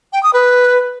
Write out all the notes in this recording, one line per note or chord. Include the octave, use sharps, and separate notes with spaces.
G5
D#6
B4